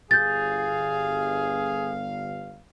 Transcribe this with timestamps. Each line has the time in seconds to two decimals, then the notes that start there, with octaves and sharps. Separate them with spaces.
0.11 G1 G#4 F5 G6 A6